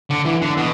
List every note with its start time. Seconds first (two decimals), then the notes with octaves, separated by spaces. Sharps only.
0.10 D3
0.25 E3
0.41 D3
0.57 B2